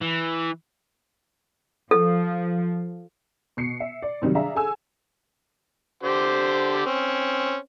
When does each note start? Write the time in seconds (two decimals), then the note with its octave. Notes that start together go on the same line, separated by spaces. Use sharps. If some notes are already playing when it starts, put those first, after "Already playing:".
0.01 E3
1.91 F3 A4
3.57 B2 C7 C#7
3.80 E5
4.02 D5
4.22 C3 D#3 F#3 G3
4.35 D4 G#4 E5 F5 A#5
4.55 G#4 A4 G#5 E6
6.03 D3 G4 C5
6.86 C4 C#4